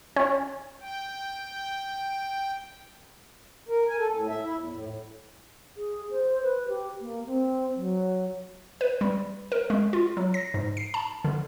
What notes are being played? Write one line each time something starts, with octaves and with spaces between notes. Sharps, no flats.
C#4
G5
A#4
G#5
A4
A2
E5
E4
E2
A2
G#4
C5
B4
G4
A#3
C4
F#3
B4
G3
A#4
G#3
F4
F#3
A#6
G#2
C7
A5
D3